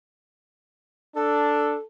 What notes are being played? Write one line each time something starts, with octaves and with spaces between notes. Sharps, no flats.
D4 A4